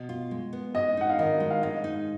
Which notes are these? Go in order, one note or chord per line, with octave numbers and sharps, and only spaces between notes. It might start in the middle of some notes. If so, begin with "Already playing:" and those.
Already playing: B2
F4
G#3
B3
G#2 D#5
D#4 F#5
F5
D#3 D#5
G#3
F5
G#2 D#5
D#4